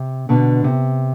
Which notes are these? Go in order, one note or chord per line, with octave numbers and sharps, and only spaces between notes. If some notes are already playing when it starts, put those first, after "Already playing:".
Already playing: C3
B2 D3
C3